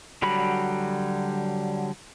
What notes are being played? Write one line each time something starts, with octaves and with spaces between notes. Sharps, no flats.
D3 F#3 G3 F#4 B5